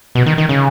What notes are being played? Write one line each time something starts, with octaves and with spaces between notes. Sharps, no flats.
B2
D#3
D#3
C#3